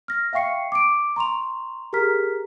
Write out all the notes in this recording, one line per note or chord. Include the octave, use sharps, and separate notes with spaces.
F6 A#6
E5 F5 G5 C#6 C7 C#7
D6 D7
A#5 C6 C#6 F7
G4 G#4 A#4 A#5 F6 B6